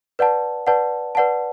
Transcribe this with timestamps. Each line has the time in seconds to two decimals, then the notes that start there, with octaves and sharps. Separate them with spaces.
0.19 B4 D5 F#5 A5
0.67 B4 D5 F#5 A5
1.15 B4 D5 F#5 A5